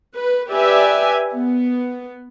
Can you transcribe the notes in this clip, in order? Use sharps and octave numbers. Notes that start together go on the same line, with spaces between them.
B4
G4 B4 D5 E5 G#5
B3